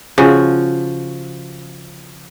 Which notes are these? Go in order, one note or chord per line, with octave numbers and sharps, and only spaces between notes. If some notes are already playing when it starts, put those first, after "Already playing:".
C#3 F3 F#4